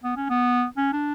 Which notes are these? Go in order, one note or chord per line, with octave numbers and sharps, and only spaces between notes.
B3
C#4
B3
C#4
D4